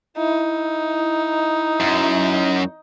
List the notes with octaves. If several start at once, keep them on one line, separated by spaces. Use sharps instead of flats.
D#4 E4
F#2